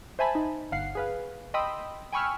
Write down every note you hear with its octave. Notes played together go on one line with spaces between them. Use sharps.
C5 E5 G#5 A5 B5
D#4
G1 F5 F#5 C7
G#4 B4 F5
D#5 G5 B5 C6 D#6 E6
G5 G#5 B5 C#6 E6 F6